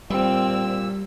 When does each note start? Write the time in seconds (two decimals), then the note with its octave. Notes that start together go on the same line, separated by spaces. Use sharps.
0.10 A#2 G3 C4 E6